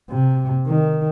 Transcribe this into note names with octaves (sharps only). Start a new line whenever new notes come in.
C3
D#3